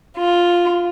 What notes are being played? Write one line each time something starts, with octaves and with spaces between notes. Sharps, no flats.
F4